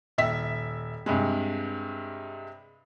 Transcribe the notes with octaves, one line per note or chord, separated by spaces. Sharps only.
D#1 E5 B6
G2 C3 G#3